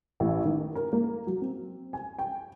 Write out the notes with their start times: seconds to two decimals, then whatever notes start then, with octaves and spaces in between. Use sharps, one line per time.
0.20 A1
0.45 D#3
0.75 A#4
0.93 A#3
1.27 F#3
1.42 C4
1.93 G#5
2.19 G5